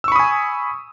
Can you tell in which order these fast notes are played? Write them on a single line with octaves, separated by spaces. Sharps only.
E6 C#6 B5 D#6 G#5